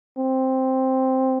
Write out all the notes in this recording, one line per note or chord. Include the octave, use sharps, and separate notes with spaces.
C4